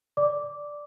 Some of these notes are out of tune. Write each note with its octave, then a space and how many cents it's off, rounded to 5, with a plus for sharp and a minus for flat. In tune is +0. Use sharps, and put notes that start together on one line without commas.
D5 +0 D6 -10